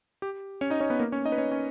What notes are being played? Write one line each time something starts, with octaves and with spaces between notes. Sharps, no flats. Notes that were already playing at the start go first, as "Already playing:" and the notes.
G4
C#4 C#5
D#4 D#5
C#4 C#5
B3 B4
A#3 A#4
C#4 C#5
D#4 D#5
B4
C#4 C#5
C#4 C#5